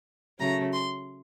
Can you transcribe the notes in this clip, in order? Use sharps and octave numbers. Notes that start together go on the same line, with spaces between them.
C#3 F#3 A3 A#5
C6